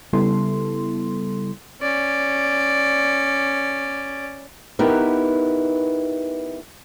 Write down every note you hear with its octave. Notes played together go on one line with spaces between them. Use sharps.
C#3 G3 B3 E4 A4 C6
C#4 D5
B3 D#4 E4 G4 A#4 B4